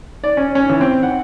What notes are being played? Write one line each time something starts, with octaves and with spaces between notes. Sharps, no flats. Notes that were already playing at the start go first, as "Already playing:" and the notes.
D5
C#4
C#4
E3
C4
F#5